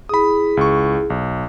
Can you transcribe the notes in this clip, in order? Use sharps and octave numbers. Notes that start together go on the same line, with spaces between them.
E4 G#4 B5 D#6
C#2 C#6
B1